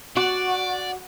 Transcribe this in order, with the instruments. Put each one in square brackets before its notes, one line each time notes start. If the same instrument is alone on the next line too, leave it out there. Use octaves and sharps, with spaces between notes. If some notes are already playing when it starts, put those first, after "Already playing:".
[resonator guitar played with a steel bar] F#4 [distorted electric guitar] D5